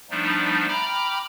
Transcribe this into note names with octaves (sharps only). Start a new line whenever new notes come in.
F3 G3 A3 B3 D4 D#4
G5 A#5 B5 D6 F6